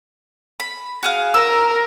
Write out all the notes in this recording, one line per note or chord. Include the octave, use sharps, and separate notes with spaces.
B5
F#4 G#4 F5
A#4 A#5 E6